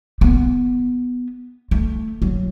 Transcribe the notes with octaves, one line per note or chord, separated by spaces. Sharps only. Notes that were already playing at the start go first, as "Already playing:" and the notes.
B3
A3
F#3